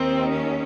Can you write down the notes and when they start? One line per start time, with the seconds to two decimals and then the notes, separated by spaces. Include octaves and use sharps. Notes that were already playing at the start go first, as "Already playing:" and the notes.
Already playing: D#2 D#3 C4
0.33 C#4